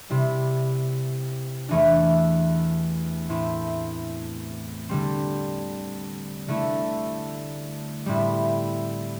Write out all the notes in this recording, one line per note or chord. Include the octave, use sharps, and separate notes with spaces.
C3 G3 E4
E2 E3 A3 D4
A2 A3 C4 E4
D3 G3 C4
D3 A3 E4
A2 G3 C4 E4